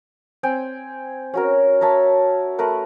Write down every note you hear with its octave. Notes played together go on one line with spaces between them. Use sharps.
C4 G5 G#5
C#4 F#4 A#4
A#4 C#5 E5 A5
A3 A#4 B4 F#5